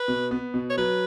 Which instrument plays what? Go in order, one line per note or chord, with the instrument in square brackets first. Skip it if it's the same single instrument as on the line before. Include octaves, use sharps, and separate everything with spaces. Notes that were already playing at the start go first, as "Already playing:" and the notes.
Already playing: [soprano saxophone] B4
[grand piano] B2
B3
B2
[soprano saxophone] C#5
[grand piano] F#3 [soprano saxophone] B4